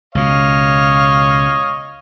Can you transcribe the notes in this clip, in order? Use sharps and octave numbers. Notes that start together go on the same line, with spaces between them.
C#2 B2 C#5 D#5 F5